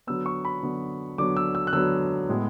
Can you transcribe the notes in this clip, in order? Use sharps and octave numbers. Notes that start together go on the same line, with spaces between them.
D3 F#3 B3 E6
C#6
B5
D3 F#3 B3
D3 F#3 B3 D6
E6
E6
F#6
D3 F#3 B3 E6
A2 G#3 B3